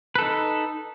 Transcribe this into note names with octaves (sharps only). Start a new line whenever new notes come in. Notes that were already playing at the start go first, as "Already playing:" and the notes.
D#4 A4 B4